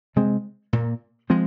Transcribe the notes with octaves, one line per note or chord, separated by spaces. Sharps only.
C3 G#3 C4
A#2 A#3
F3 G#3 C4